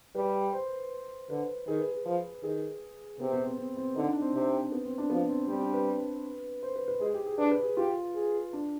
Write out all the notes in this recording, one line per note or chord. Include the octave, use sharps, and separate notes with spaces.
G3 B4
C5
D3 B4
D#3 G#4
B4
G#4
F3
D#3 G#4
C3 B3
B3
C4
C4
C4
D3 D#4
D4
C4
C3
B3
C4
D4
F3 B3
C4
G3 C4
D4
B4
C5
B4
B4
G#3 G#4
G4
G#4
D4 B4
B4
G#4
F4 G4
G#4
D4